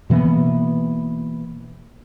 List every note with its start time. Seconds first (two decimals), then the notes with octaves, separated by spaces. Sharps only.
0.10 B2 E3 A#3 B3